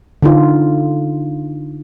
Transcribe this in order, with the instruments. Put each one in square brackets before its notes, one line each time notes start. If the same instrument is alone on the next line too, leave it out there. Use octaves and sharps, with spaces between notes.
[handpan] D3 D#4 F4